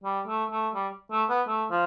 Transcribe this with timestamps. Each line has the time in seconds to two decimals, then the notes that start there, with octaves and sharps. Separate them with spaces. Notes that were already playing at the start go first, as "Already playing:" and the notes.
0.04 G3
0.28 A3
0.51 A3
0.75 G3
1.12 A3
1.29 B3
1.48 A3
1.71 F3